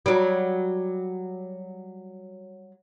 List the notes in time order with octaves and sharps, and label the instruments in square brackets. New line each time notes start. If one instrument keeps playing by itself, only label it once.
[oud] F#3 G3